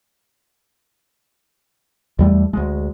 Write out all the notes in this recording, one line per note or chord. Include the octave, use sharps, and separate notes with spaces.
E2 G3 A3
D2 G#3